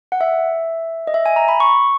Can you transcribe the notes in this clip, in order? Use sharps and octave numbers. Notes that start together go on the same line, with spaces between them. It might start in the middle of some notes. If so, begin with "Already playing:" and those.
F#5
E5
D#5
E5
G#5
A#5
B5
C#6